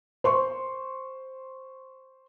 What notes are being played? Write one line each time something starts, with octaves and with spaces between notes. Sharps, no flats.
C5 C6 C#6